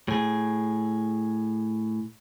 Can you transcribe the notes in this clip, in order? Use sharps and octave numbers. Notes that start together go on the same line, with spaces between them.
A2 G#4